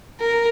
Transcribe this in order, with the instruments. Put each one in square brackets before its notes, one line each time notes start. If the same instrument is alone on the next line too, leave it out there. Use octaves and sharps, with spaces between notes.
[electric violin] A#4